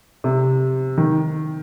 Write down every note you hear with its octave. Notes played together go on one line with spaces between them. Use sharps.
C3
D#3